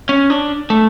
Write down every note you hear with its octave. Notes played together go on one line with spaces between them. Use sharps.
C#4
D4
A3